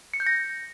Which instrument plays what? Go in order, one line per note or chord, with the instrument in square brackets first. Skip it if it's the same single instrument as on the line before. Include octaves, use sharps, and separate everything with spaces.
[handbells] C#7
G6
A#6